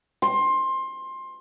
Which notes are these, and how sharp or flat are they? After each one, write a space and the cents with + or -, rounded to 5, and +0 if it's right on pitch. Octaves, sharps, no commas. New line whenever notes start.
C6 +20